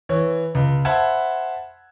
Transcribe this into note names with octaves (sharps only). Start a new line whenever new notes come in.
E3 C#5
C#2
C5 E5 F#5 A5 B5 G#6